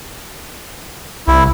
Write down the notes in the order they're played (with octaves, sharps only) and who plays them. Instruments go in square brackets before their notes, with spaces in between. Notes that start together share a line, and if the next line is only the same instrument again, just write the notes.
[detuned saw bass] C2 [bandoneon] E4